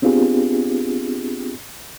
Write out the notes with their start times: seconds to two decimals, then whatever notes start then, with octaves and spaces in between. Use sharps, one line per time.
0.02 B3 C4 D4 F4 G4 G#4